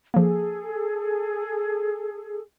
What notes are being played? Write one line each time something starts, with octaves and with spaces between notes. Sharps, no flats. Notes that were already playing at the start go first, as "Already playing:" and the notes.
F3 A#3 G#4 A4